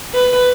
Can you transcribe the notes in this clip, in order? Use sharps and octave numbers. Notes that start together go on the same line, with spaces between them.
B4